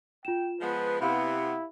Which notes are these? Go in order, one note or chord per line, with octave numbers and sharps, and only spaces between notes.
F4 G5 E7
F3 G#3 B3 B4
C3 B3 E4 G4 F5 B5